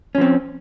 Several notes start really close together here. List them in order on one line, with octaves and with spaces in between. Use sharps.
C#4 F3 C4